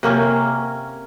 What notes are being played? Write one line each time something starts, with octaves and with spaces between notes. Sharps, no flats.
C3 A#3 C#4